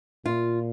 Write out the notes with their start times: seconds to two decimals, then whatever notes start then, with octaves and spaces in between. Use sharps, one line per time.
0.26 A#2 F4